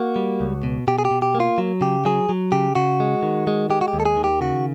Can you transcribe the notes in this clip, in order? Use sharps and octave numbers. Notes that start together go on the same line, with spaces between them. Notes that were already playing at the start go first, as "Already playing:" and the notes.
Already playing: A#3 F#4
G3
C#2
B2
B2 G4
G#4
G4
B2
G4
A#3
F4
F#3
C#3 G4
F#3 G#4
F#3
C#3 G4
C#3 F#4
G#3
D#3
G#3
G#3 G4
F#4
G4
D#2
A4
G#4
D#3
G4
C#3 F#4